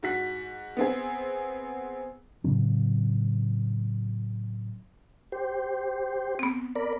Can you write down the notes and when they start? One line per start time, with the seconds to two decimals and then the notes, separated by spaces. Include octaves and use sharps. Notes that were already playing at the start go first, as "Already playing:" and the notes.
0.03 G#2 F#4 B6
0.77 B3 C4 G#4
2.44 A2 C#3 F#3 C4
5.32 G4 C5
6.39 B3 C4
6.76 A#4 D5 B5